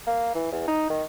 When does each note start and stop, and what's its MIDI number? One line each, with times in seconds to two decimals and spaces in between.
0.07 0.32 58
0.35 0.48 52
0.52 0.63 40
0.68 0.85 63
0.90 1.03 51